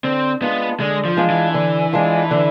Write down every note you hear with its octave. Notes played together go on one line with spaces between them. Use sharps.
D3 C4
G#3 B3 D4 F4
D3 G#3
F3
G#3 D4 F4
E3
D3
G#3 D4 F4
D3